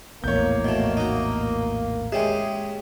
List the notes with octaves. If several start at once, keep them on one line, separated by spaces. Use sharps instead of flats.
A#1 E2 A2 A#3 C#5 G6
B2 A3
D#4 F#4
G#3 C#4 G4 G#4 E5